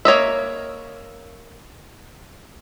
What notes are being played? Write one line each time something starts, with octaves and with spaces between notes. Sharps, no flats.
A#3 C#5 D#5 E5